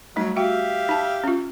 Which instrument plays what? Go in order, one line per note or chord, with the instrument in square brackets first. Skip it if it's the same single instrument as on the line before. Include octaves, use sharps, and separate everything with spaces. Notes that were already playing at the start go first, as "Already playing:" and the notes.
[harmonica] F#3 [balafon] G3 A3 D#4
[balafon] F#4 G5 [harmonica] G4 E5 F5
[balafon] D#4 A5
C#4 F4